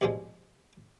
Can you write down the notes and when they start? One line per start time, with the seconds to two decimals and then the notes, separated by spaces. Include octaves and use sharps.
0.01 C2 G2 B2 F3 G#3